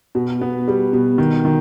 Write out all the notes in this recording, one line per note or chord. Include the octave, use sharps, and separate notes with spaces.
B2
B3
G3
B2
D#3
D#3